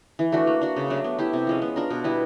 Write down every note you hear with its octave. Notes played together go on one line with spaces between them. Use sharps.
E3
A3 D4 F#4
A#3
D4 F#4
C#3
F#3 A3 D4
B3
E4 G4
C3
F3 G#3 C#4
B3
D4 F4 A#4
B2
G3 B3 E4